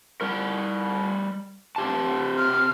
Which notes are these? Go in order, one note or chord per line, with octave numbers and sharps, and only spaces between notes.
G3 A#4
C3 G4 A5
F6